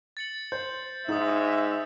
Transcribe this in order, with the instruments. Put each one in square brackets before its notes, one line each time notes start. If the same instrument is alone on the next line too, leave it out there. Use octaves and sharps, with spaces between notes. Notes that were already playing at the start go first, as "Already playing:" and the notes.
[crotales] A6 C#7 F#7
[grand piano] C5 [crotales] G6
[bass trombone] G#2 [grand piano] D#4 [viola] E5 [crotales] D#6 G6